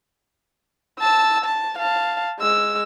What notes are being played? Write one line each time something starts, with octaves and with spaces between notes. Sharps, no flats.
A5 E6
A5
F5 A5
G#3 E6